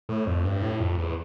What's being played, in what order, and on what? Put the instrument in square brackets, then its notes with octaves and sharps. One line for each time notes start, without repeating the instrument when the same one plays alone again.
[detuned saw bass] A2
F2
G2
A2
F2
E2